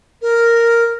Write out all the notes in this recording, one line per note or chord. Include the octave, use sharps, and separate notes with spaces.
A#4